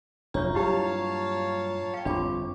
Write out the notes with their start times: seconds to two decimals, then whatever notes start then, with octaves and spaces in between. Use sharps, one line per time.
0.34 F1 F#3 D4 F4 C#5 E5 A#5 C#6
0.55 G2 A#2 F#3 E4 G4 C#5 F5 A5
1.94 C#5 F5 G5
2.05 G1 F2 C4 D4 F4 C#6 D6